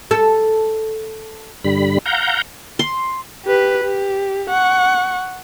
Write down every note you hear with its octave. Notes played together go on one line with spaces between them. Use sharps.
A4
G2 D3 G3 B5
F5 F#5 A#5 G6
C6
G4 B4
G4
F#5 C#6